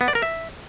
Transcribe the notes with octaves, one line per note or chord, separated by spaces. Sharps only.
B3
D5
A#4
E5